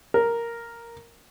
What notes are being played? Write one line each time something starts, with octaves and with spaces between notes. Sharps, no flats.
A#4